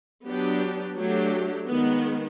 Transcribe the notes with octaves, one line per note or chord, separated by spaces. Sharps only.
F#3 B3 D4 G4
F#3 A3 D4 G4
D#3 G#3 B3